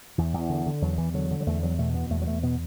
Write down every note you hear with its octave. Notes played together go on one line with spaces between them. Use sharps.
E2 E3
E2
D3
D3
E2 F#3
E2 E3
D3 F#3
D3
F#3
E2 A3
E2 F#3
B2 A3
B2 B3
E2 A3
F#3
E2 A3
B2 B3